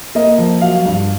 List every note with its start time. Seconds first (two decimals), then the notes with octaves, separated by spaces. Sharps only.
0.15 A#3 D#5
0.38 F3
0.61 F#3 F5
0.86 G2